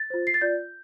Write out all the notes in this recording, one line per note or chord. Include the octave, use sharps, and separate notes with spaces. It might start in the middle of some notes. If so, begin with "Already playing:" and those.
Already playing: A6
F4 C5
C7
A6
F4 D5 G6